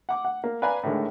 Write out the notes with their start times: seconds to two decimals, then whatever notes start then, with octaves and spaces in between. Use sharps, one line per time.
0.09 F#5 D6
0.25 F#5
0.44 A#3
0.62 B4 D5 F5 G#5 A#5 B5
0.83 A2 D3 D#3 G#3